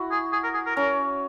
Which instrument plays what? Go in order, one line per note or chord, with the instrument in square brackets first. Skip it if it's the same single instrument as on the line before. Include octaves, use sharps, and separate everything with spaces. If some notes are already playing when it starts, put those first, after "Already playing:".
Already playing: [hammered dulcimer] E4 F#4
[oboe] G#4
G#4
A#4
G#4
A#4
[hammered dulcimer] C#4 [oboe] A#4